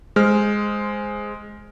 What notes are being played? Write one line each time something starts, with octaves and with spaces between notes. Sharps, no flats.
G#3 C5 F6